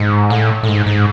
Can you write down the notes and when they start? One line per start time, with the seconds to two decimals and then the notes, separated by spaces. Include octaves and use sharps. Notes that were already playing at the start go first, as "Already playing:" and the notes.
Already playing: G#2
0.30 A2
0.63 A2
0.68 G#2
0.86 G#2